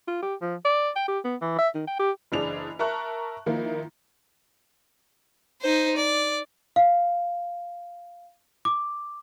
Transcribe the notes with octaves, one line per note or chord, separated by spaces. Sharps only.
F4
G4
F3
D5
G5
G4
B3
E3
E5
D#3
G5
G4
F#1 E3 D4 G#4 F7
A#4 E5 A5 A#5 C#6 F#6
D#3 F3 A#3 E4
D#4 C5
D5
F5
D6